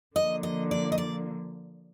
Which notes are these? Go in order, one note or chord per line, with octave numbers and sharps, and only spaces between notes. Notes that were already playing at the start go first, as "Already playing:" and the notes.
D3 F3 A#3 D#5
D#5
D5
D#5
D5